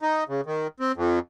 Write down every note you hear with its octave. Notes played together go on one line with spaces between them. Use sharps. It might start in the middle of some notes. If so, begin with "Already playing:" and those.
D#4
C#3
D#3
C4
F2